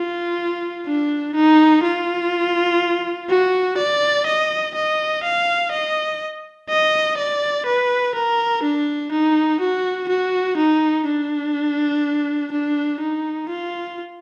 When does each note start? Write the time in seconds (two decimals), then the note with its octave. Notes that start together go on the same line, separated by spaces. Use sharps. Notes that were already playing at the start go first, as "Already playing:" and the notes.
Already playing: F4
0.87 D4
1.35 D#4
1.84 F4
3.29 F#4
3.77 D5
4.26 D#5
4.75 D#5
5.24 F5
5.72 D#5
6.69 D#5
7.17 D5
7.66 B4
8.15 A#4
8.63 D4
9.12 D#4
9.60 F#4
10.09 F#4
10.57 D#4
11.06 D4
12.52 D4
13.00 D#4
13.49 F4